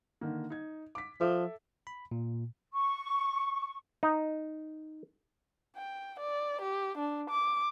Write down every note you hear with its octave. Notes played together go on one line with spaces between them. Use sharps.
D3 D#3 A#3
D#4 G#6
D6 B6
F3 A4 E5 D6
B5
A#2
C#6
D#4
G5
D5
G4
D4
D6